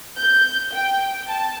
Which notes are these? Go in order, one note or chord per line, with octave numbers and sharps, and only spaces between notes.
G6
G5
A5